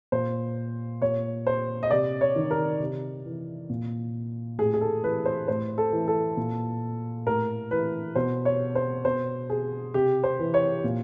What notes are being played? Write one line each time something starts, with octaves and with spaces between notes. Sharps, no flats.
A#2 C5
A#2 C#5
C5
D#5
C3 D5
C#5
D#3
A#4
C3
E3
A#2
A2 G#4
G#4
A4
E3 B4
C5
A2 C5
A4
E3
A4
A#2
A2 A#4
E3 B4
B2 C5
C#5
C5
B2 C5
G#4
C3 G4
C5
E3
C#5
A#2